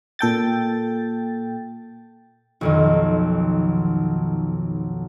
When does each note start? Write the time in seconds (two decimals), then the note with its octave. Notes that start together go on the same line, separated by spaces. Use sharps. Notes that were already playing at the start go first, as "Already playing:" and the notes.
0.19 A#2 A4 G5 A6
2.61 B1 F2 D#3